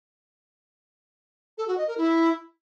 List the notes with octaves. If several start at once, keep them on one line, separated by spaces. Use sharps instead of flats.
A4
F#4
D#5
A#4
E4